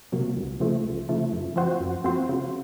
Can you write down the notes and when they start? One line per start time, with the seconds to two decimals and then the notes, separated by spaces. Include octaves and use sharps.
0.12 C3 F#3 A#3
0.36 C#2
0.60 C#3 F3 A3
0.84 C#2
1.09 C#3 F3 A3
1.32 F#2
1.56 F3 C4 F#4 C5
1.80 F#2
2.04 F3 C4 F#4 C5
2.29 C#3